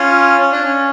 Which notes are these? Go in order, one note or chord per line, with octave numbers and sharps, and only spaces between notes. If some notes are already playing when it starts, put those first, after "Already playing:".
Already playing: C#4 F4
C#4
D4
C#4